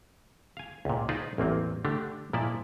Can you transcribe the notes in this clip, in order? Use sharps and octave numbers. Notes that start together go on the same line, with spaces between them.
F5 G#5
C#2 A#2
D#4 F4 G#4 B4 C5 D5
A1 E2 A#3 C4
D3 A3 D4 G4
A#2 F3 E4 D5 D#5 A5